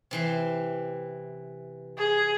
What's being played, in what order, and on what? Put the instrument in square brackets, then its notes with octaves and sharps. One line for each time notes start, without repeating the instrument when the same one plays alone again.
[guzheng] C3 E3 C6
[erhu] G#4